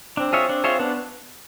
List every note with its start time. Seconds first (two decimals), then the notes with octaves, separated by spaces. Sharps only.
0.17 C4 D4
0.33 F4 G#4 C#5 E5
0.49 D4
0.64 F4 G#4 C#5 E5
0.79 B3 D4